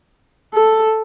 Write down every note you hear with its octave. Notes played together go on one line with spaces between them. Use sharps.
A4